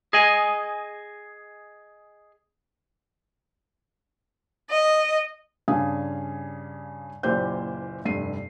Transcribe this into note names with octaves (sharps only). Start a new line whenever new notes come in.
G#4 D#5 G#5
D#5
G2 C#3 D4 F5 G#5 D#6
F#1 A#2 E3 G4 C5 G6
F1 G2 C7 D#7